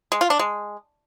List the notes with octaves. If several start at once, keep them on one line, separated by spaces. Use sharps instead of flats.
G#3
F4
D4
G#3